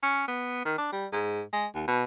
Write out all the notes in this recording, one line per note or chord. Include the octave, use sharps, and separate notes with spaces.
C#4
B3
D#3
D4
G3
G#2
G#3
D#2
B2